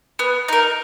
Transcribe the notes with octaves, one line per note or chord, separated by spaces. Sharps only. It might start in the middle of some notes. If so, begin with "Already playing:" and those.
B3
D#4 A#4